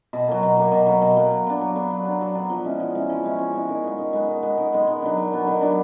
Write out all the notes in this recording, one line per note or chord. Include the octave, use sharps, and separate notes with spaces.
B2
F#3 A#3
B2
F#3 A#3
B2
F#3 A#3
B2
F#3 A#3
F#3
B3 D4
F#3
B3 D4
F#3
B3 D4
F#3
B3 D4
F3
G#3 C#4 E4
F3
G#3 C#4 E4
F3
G#3 C#4 E4
F3
G#3 C#4 E4
D#3
G#3 B3
D#3
G#3 B3
D#3
G#3 B3
D#3
G#3 B3
D#3
F#3 B3 D4
D#3
F#3 B3 D4
D#3
F#3 B3 D4